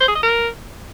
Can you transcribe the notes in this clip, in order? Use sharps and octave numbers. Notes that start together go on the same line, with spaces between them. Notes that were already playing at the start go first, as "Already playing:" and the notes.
C5
G#4
D#5
A#4